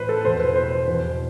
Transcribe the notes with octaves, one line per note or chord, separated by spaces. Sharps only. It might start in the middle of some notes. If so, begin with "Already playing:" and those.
Already playing: A2 E3 B4 C5
A4
E2 B2 C5
B4
C5
C5
E2 B2